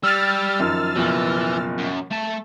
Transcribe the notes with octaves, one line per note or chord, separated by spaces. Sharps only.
G3 E6 F6 A6
F#2 D#3 F3
F#1 B2 E3 F3
F#2
A3 A5